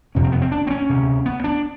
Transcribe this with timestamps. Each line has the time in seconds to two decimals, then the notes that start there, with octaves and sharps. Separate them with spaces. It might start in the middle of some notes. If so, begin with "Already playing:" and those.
0.15 F2 C3 C#4
0.24 C4
0.32 B3
0.42 C4
0.52 D4
0.67 C4
0.70 C#4
0.89 D2 C3
1.26 B3
1.44 D4